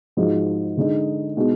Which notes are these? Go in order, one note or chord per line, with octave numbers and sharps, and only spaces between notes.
G#2 F3 G#3 D#4 F#4
D3 G#3 D#4
B2 G#3 D#4 F#4